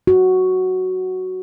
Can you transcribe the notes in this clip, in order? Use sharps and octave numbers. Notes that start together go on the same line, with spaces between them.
F#4